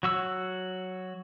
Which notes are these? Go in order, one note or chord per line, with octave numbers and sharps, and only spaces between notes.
F#3 F#4 E6